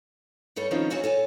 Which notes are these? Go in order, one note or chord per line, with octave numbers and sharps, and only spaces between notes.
G2 G3 A4 C#5
D#3 F3 C4 C#4 D#4 F4
D#2 C#4 F#4 A4 A5
A4 C#5 G#5